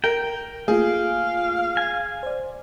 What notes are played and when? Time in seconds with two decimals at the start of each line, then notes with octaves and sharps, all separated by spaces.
0.04 A#4 G5
0.68 A3 A#3 F4 G#4 F5
1.77 G#5
2.23 C5 D5